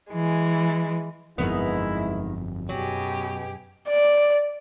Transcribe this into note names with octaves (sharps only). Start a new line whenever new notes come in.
E3 G#3
G1 F2 G#2 D#3 G#3 B3 E4
F#2 B2 F#3 G4 G#4
D5